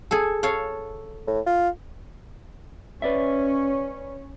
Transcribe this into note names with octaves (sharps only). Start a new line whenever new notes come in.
G#4 A4
A4 C#5 F5
A2
F4
C#4 B4 D5 E5